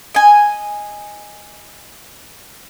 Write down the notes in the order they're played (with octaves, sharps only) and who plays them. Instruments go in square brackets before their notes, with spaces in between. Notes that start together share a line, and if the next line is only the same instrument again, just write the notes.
[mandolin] D#5 G#5